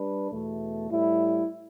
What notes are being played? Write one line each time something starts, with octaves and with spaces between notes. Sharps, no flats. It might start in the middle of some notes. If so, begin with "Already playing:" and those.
Already playing: G3 D4 B4
E2 B2 A3
A2 G3 E4